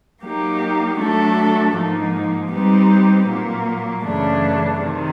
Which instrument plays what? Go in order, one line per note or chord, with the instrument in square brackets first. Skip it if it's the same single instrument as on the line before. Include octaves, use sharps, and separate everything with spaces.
[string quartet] F#3 A#3 D#4 G4
F#3 A3 D4 F#4 A4
G#2 F3 A#3 D#4
G3 C4 D#4 G4 B4
A#2 F#3 A#3
F#2 C#3 E3 A3 D4
C3 D#3